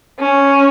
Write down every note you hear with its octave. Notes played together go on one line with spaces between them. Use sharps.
C#4